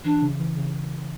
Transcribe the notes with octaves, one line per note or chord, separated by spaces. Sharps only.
E3 D4
C#3
E3
C#3